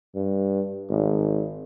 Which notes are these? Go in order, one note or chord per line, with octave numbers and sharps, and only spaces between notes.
G2
G#1